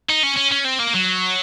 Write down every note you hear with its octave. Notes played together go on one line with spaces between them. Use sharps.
D#4
C#4
C#4
C#4
C4
A#3
F#3